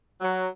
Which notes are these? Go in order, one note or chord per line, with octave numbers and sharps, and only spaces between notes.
F#3